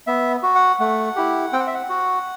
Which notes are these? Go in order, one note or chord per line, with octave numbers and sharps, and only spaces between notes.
B3 E5
F#4
F#5
A3 F#5
E4 G4
C4 G5
F#5
E5
F#5
F#4